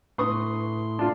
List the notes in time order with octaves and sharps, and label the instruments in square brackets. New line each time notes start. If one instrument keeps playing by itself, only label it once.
[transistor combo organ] A2 C6 [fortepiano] B4 C#6 D#6
[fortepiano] D4 F4